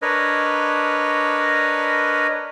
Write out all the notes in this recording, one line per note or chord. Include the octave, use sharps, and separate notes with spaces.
D4 A#4 B4 C#5 D#5